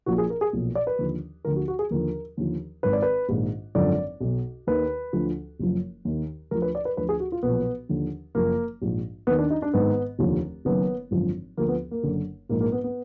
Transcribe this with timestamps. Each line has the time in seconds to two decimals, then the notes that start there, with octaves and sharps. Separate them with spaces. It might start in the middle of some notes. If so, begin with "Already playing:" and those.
0.06 A#1 A#2 F3 F#4
0.18 G#4
0.30 A#4
0.41 G#4
0.53 B1 A#2 F3
0.75 D5
0.87 B4
0.98 D#2 D3 F3
1.45 D2 D3 F3 A#4
1.56 F#4
1.68 F#4
1.79 G#4
1.90 D#2 D3 F3 A#4
2.37 D#2 D3 F3
2.83 G#1 G#2 D#3 B4
2.93 D5
3.02 B4
3.29 A#1 G#2 D#3
3.75 G#1 F#2 D3 F3 D5
4.21 B1 B2
4.67 D#2 D#3 B4
5.13 D2 D3 F3
5.59 F#1 F#2 F3
6.05 D#2 D#3
6.51 D2 D3 F3 A#4
6.62 B4
6.75 D5
6.85 B4
6.97 D2 D3 F3 B4
7.09 G#4
7.20 F#4
7.32 F4
7.43 B1 A#2 F3 B3
7.89 D#2 D3 F3
8.35 F#1 F#2 F3 A#3
8.82 A#1 G#2 F3
9.27 D#2 D#3 B3
9.39 D4
9.51 D#4
9.62 D4
9.73 G#1 G#2 D#3 B3
10.19 F1 D#2 D3 F3
10.65 F#1 F#2 D#3 B3
11.11 G#1 F#2 D3 F3
11.57 D2 D3 F3 A#3
11.68 B3
11.91 A#3
12.03 F#1 F#2 D3
12.49 A#1 G#2 F3 A#3
12.60 A#3
12.72 B3
12.84 B3